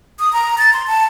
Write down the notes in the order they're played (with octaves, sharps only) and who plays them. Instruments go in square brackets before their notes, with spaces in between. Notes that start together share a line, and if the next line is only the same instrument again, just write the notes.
[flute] D#6
A#5
A6
C6
A5